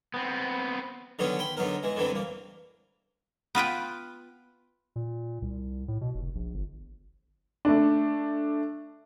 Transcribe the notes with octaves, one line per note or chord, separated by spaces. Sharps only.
B3 C4
D3 D#3 F#3 B3 C#4 G#4
G5 B5 C6
D3 F#3 B3 D#4 A#4
E3 G#3
D3 E3 F#3 B3 C4
C2 A#3
B3 F4 B4 G5
A#2
C2
A2
B2
F1
A#1
G1
A3 D4